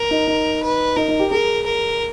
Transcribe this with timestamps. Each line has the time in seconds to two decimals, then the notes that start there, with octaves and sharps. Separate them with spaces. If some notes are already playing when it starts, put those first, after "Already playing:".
Already playing: A#4
0.11 D#4
0.28 D#4
0.62 B4
0.96 D#4 A#4
1.08 D#4
1.19 G4
1.31 G#4 A#4
1.65 A#4